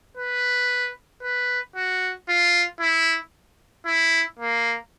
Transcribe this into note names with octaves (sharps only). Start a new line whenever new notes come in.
B4
B4
F#4
F4
E4
E4
A#3